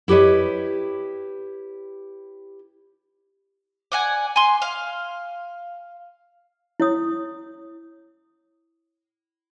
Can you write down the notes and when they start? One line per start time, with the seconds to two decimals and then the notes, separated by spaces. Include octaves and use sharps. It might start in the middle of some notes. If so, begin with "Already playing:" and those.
0.08 E4 G4 B4 C#5 D#5
3.92 D5 F#5 G#5
4.36 G#5 C6
4.62 F5
6.80 E4 C#5 D#6